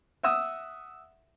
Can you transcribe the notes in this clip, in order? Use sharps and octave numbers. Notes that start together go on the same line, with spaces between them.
E5 F#5 D#6 E6